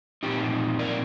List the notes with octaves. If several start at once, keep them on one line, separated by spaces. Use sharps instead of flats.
A#2 F3 C4 D#4 G4
A#4 D5